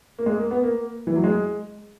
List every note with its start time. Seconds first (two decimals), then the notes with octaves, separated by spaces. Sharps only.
0.19 A#3
0.26 G#3
0.39 A#3
0.51 B3
0.64 A#3
1.07 E3
1.16 F#3
1.24 G#3